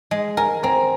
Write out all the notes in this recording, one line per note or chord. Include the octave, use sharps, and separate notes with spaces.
G#3
A#4 G#5
C4 A#5